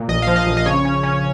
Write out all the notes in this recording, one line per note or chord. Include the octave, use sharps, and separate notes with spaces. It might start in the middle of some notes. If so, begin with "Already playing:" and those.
Already playing: A#2
A#1 D#5
F3 F5
D#5
A#1
D#5
C#3 C#5
C#4
C#4